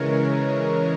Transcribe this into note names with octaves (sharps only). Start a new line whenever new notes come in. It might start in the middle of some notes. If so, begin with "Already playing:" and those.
Already playing: C#3 E3 G#3 A#4 C#5